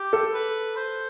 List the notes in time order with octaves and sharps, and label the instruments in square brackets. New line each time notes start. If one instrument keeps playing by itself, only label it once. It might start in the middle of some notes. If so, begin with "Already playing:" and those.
Already playing: [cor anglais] G4
[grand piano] A4
[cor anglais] B4
C5